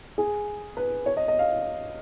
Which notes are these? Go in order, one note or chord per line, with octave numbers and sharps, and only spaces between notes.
G#4
B4
C#5
D#5
D#5
F5